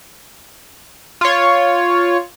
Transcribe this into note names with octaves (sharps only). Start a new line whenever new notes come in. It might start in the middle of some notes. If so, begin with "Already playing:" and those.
F4 C#5